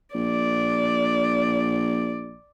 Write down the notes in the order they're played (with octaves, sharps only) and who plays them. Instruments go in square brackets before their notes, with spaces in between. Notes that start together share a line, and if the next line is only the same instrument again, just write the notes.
[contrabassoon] A#1 [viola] D5